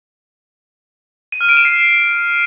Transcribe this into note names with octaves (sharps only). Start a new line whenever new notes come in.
D#7
F6
D7
E7
C7